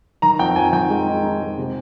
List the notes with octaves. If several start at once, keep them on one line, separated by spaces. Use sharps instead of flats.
D#3 A#5
F2 G5
F2 G#5
D#3 G5
G#3
D#4
D#4
G#3
C3